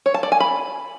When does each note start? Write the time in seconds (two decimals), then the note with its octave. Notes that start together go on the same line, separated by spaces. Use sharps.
0.06 C#5
0.14 A5
0.23 D5
0.32 G#5
0.40 B5